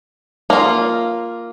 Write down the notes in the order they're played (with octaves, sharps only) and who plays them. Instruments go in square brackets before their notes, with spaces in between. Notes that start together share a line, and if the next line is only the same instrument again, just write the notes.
[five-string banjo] A#3 F4